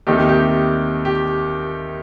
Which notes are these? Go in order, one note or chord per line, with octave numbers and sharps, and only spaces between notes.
D#2 D#3 A3 C4 D#4 G4
G4
G4
G4